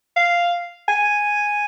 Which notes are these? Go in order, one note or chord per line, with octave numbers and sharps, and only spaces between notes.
F5
G#5